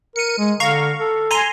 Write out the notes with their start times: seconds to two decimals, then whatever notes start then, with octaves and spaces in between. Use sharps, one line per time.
0.16 A#4 C#7 D#7
0.39 G#3
0.60 D3 F5 A#5 C#6
0.99 A4
1.31 G#5 A#5 C6